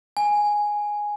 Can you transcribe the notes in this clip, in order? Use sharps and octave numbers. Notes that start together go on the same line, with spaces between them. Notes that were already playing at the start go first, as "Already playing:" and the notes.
G#5